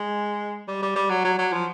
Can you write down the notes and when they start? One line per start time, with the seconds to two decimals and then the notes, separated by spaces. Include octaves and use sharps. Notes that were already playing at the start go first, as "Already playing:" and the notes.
Already playing: G#3
0.68 G3
0.83 G3
0.96 G3
1.10 F#3
1.25 F#3
1.39 F#3
1.53 F3